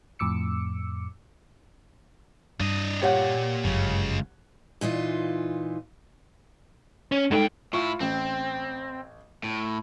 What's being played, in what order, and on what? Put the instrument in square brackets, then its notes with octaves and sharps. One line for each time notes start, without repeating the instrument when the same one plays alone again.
[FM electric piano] F2 A2 D6 E6 C#7
[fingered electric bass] G2 [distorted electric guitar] D4 D#5
[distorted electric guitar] A#2 [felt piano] G4 C#5 F#5
[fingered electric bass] G1 F#2 [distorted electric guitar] C#2 C#3
[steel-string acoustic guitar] A#2 E3 D#4 F4
[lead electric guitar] C#4
[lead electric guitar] G2 G5 [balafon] G#3 D#4 A4
[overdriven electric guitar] A2 E4 [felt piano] F4 C#6
[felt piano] A1 [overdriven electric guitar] C4
[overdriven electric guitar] A2